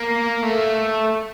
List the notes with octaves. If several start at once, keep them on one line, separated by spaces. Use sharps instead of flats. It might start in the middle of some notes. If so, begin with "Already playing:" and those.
Already playing: A#3
A3